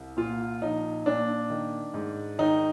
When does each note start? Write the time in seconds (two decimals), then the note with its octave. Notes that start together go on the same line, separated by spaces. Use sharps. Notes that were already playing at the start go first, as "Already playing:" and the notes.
Already playing: C2
0.17 A#2 F4
0.62 A#1 D#4
1.06 A#2 D4
1.50 D#3
1.94 G#2
2.39 D#3 D#4